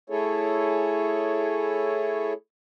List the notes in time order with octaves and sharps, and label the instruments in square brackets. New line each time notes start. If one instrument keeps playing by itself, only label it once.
[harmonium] A3 E4 G#4 A4 C#5